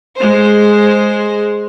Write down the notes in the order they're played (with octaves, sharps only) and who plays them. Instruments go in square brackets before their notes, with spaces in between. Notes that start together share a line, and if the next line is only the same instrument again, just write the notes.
[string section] G#3 C5